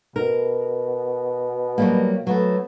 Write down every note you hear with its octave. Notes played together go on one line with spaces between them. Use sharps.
B2 A#4
F#3 G3 A#3
F#3 A3 B3